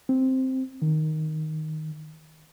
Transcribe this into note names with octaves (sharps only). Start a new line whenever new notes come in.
C4
D#3